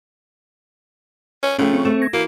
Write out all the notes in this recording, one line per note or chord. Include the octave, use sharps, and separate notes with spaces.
C#4
C#3 F3 A3 C#4 G5
C4 C#6
A3 E7
G#6 A#6
E3 A#3 F#4